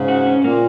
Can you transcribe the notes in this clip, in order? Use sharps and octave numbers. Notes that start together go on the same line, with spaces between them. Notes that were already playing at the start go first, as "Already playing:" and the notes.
Already playing: G#2 C#3
F#4
C#4
A#2 A#3